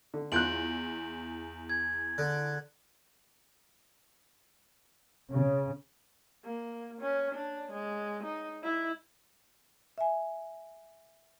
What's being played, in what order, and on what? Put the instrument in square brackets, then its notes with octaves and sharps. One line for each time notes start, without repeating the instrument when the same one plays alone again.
[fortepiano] D3
[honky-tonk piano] E2 [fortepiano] F4 F#6 [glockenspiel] G6 D7 F#7
[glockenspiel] G#6
[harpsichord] D3 [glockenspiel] F#6
[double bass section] C#3
[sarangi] A#3
C#4
D4
G#3
D#4
E4
[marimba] E5 G#5